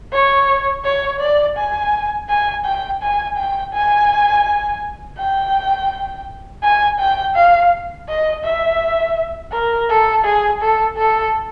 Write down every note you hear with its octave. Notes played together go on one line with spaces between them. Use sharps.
C#5
C#5
D5
G#5
G#5
G5
G#5
G5
G#5
G5
G#5
G5
F5
D#5
E5
A#4
A4
G#4
A4
A4